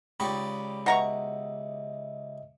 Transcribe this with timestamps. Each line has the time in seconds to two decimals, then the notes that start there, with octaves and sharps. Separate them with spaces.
0.20 C#2 D#4 G4 D5 G5 B5 C#6
0.86 B2 D#5 E5 F#5 A#5 C#6